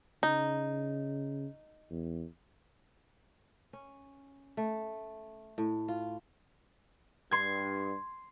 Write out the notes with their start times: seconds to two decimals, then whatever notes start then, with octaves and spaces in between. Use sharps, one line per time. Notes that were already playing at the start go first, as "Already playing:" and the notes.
0.23 C#3 D#4
1.91 E2
3.73 C#4
4.57 A3
5.58 A2
5.88 F4
7.31 G2 C6 G#6